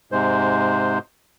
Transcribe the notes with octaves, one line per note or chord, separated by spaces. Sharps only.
G#2 C3 G#3 C5